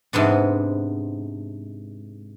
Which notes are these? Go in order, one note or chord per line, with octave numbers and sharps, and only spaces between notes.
G#2 C3 B3 D4